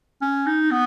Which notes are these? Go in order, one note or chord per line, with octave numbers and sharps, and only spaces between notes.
C#4
D#4
B3